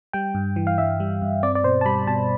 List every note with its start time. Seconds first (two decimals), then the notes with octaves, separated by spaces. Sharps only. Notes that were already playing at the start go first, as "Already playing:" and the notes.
0.13 G3 G5
0.35 G2
0.56 E3
0.67 F5
0.78 G2 E5
1.00 G3
1.22 G2
1.43 C4 D5
1.55 D5
1.64 B2 C5
1.81 A5
1.85 G3 B5
2.07 B2 A5